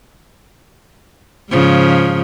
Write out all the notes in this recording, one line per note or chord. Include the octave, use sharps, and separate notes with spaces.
G#2 C#3 F3